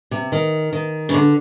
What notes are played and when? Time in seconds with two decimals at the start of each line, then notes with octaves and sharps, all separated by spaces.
0.11 C3
0.32 D#3
0.73 D#3
1.09 C#3
1.14 D3